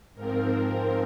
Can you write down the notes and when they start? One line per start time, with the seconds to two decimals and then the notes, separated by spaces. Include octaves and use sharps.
0.15 G#2 F3 C4 A#4